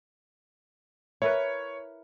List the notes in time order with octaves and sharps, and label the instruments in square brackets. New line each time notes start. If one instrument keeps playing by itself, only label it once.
[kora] E4 A#4 B4 [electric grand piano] C#5